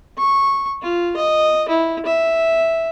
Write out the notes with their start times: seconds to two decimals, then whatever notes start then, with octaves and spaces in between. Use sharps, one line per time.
0.18 C#6
0.82 F4
1.17 D#5
1.69 E4
2.06 E5